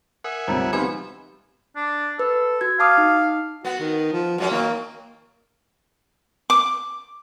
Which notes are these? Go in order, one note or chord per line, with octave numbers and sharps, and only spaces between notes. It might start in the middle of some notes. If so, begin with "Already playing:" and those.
A#4 E5 F#5 G#5
D2 C3 G3 G#3 F4
F3 B3 C4 D#4 G4 G#5 B5
D4
A4 B4
F#4 G#6
F5 A5 D6 D#6
D#4
B3 F#4
D#3
F3
F#2 F#3 G#3 C#4
D#3 A#3
D6